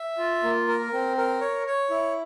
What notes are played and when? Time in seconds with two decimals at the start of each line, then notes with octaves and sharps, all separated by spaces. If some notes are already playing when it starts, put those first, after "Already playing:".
Already playing: E5
0.18 F4
0.43 A#3
0.68 A#4
0.93 C4
1.17 A#4
1.41 C#5
1.66 C#5
1.90 E4